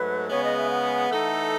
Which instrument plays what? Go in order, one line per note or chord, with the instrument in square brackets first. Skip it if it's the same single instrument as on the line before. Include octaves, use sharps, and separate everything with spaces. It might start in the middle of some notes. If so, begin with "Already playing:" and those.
Already playing: [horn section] G#2 F#3 A3 [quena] B4
[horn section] C#3 G#3 B3 [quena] C#5
[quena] D#5
E5
F#5
[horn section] E3 A3 D#4 A4